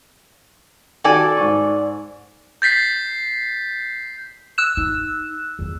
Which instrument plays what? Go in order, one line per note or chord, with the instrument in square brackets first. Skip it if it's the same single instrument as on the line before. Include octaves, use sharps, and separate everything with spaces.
[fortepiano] D#3 F#4 [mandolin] A4 D5 G#5
[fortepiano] G#2 C#6
[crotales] G6 A6 B6 C7
[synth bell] E6 F#6 E7
[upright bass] D#4
E2 G3